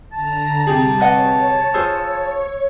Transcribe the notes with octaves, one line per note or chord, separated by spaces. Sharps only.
D3 A5 A#5
C3 G3 G4 G#4
B4 C#5 D#5 F#5
F4 G#4 C5 E6